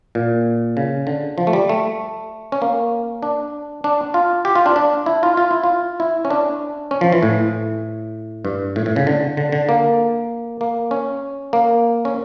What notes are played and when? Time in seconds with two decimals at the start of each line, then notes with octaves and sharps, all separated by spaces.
0.15 A#2
0.77 C#3
1.07 D3
1.38 F3
1.47 A3
1.53 G3
1.69 A3
2.52 C#4
2.62 A#3
3.23 D4
3.84 D4
4.14 F4
4.45 G4
4.55 F4
4.66 D4
4.76 D4
5.06 E4
5.23 F4
5.37 F4
5.51 E4
5.64 F4
6.00 E4
6.25 C#4
6.30 D4
6.91 C#4
7.01 F3
7.12 E3
7.23 A2
8.45 G2
8.76 A2
8.86 A2
8.96 C#3
9.07 D3
9.37 D3
9.52 D3
9.69 A#3
10.61 A#3
10.91 C#4
11.53 A#3
12.05 C#4